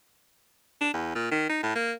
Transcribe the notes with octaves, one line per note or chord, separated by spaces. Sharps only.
D4
E2
A#2
D#3
D#4
A2
A#3